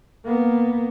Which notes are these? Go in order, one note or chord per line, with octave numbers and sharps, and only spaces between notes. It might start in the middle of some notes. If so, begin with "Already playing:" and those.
A#3 B3